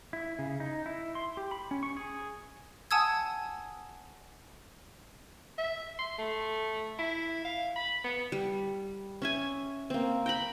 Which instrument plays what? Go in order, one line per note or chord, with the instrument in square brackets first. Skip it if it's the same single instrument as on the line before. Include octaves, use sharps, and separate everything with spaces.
[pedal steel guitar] E4
C#3
D#4
E4
C6
G4
B5
C#4
C#6
G#4
[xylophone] F#5 G#5 A5 D#6 E6 G#6
[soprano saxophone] E5
C6
A3
E4
F5
B5
B3
[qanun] G3
C#4 E5 G#5
A#3 C4
G5 A#5 B5